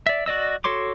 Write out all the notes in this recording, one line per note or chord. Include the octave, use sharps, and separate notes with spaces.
D5 E5
F#4 D5 D#5 E6
F#4 A4 C#5 C6 D6